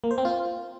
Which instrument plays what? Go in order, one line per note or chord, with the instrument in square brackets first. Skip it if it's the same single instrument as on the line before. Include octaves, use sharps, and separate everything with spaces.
[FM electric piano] A#3
C5
C4
F4